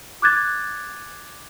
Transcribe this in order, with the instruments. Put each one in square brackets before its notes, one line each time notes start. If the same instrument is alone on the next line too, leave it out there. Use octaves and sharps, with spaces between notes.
[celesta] D6 F#6 G#6 A6